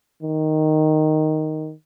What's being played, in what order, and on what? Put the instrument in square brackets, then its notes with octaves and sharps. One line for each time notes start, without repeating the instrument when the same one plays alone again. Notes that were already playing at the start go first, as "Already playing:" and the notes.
[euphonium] D#3